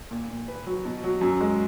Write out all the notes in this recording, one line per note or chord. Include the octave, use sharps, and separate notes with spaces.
A#2
A#2
B4
F#3
B2
F#3
F#2
G#3